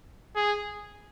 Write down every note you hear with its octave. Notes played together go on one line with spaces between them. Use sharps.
G#4